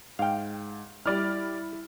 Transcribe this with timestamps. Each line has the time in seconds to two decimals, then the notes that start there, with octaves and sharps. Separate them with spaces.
0.19 G#2 F5 G5
1.06 G3 E4 D5 F6